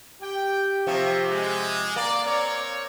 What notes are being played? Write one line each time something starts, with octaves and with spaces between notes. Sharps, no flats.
G4 G5
C3 F3 F4 E5 C#6
G#3
A#3 D5
C4 A#4 C#5 D5